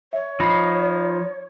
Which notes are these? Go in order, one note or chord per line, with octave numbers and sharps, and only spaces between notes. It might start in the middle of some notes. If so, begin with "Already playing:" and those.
C#5 E5
F3 D#4 B5 C7